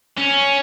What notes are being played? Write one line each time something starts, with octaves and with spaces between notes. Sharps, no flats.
C#4